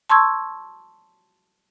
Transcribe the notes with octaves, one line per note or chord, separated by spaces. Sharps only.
A5 C6 C#6 E6 G#6